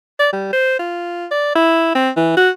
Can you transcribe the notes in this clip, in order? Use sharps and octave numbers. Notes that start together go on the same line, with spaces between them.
D5
G3
C5
F4
D5
E4
C4
E3
F#4